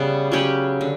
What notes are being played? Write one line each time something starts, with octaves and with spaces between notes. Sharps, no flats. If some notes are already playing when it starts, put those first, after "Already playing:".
Already playing: C#3 G3 B3 C#4
F#3 C#4 G4 B4
D3